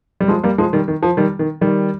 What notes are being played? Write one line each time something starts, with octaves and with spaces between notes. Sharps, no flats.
G3
F3 G#3
G3 A#3
F3 G#3
D#3 G3
D#3
F3
D#3 G3
D#3
D#3 G3